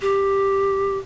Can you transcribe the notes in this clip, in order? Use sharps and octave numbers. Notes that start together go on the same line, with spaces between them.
G4